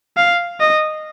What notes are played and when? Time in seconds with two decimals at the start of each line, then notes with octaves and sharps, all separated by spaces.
0.17 F5
0.60 D#5